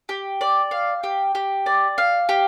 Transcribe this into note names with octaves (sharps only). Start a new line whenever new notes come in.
G4
D5
F5
G4
G4
D5
F5
G4